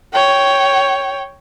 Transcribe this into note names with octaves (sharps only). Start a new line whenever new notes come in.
C#5 G5